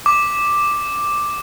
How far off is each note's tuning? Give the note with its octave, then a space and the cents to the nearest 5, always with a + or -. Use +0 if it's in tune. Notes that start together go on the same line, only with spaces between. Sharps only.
D6 +5